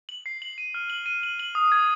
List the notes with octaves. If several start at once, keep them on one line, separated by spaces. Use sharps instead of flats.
F#7
C7
F#7
D#7
F6
F#7
D#7
F#7
F#7
D#6
G#6